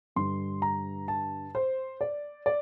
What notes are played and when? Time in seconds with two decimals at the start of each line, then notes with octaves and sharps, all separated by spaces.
0.16 G2 D3 G3 D4 C6
0.62 A#5
1.08 A5
1.55 C5
2.01 D5
2.46 D5